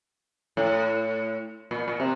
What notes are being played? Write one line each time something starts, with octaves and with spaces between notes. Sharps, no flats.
A2
A#2
A#2
C3